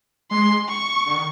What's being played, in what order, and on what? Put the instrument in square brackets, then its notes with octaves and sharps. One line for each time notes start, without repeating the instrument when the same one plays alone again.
[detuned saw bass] G#3 [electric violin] C6
[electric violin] C#6
[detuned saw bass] D3
D#3